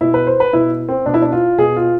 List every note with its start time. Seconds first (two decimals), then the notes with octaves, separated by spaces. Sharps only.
0.01 B2 E4
0.14 B4
0.27 C5
0.40 B4
0.53 B2 E4
0.89 C4
1.06 B2 D4
1.14 E4
1.22 D4
1.32 F4
1.58 B2 G#4
1.76 F4